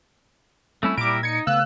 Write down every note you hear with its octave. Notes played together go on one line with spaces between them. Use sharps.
G3 A3 C4 C#4 E4
A#2 G3 E4 A#4 D6 D7
D#4 G#6 C#7
C#3 A3 B3 F5 E6 F#6